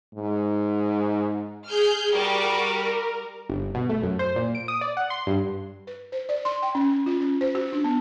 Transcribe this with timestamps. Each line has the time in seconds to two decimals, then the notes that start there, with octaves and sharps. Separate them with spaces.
0.14 G#2
1.67 G#4 F6 G6
2.12 G3 F#4 A#4
3.50 G1
3.75 B2
3.89 A3
4.03 F#2
4.19 C5
4.36 A#2
4.55 D7
4.68 D#6
4.81 D5
4.97 F#5
5.10 C6
5.27 G2
5.87 B4
6.12 C5
6.29 D5
6.45 C6
6.62 G5
6.75 C#4
7.06 F4
7.20 C#4
7.41 C5
7.55 F#4
7.73 D4
7.84 B3